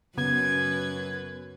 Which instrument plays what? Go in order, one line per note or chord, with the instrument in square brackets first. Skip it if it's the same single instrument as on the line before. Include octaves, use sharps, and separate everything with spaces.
[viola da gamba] F#2 B4 [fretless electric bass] C#3 [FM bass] B3 [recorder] G#6